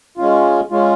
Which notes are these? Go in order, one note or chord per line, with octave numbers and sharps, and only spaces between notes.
G#3 C#4 F4
G#3 C#4 F4